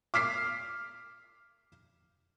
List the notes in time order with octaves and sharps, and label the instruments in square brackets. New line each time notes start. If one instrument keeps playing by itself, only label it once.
[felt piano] D6 F6 B6 C7